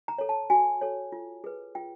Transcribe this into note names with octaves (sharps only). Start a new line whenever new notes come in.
A#5
A4 C#5
A5
F#4 G#5
A4 C#5
F4
G#4 B4
F4 G5